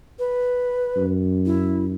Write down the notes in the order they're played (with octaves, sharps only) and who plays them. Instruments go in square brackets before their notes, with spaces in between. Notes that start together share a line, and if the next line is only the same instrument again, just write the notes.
[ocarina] B4
[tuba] F#2
[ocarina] E4